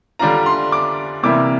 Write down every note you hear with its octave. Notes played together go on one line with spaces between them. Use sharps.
D3 G3 D4 F4 A#5
C6
D6
C3 E3 G3 A#3 E4 D6